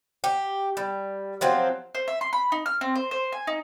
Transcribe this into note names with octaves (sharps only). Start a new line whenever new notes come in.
G4
G3
F3 F#3 C4
C5
E5
C6
B5
D#4
F6
C4
C5
C5
G#5
D#4